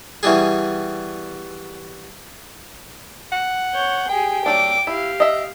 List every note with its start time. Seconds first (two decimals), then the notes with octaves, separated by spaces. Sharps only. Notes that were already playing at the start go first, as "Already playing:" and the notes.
0.23 B2 E3 G3 G#4
3.32 F#5
3.74 C#5 G6
4.09 G4 G#4 G5
4.46 F#3 A3 D4 D6
4.87 E4 G4 F5
5.20 D#5 E5